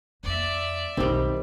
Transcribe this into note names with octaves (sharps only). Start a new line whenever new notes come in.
F2 A#3 D5 E5
B1 F2 D#3 G3 C4